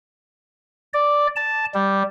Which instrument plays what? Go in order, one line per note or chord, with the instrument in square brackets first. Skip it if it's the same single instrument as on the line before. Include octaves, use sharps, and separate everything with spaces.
[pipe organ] D5
A5
G3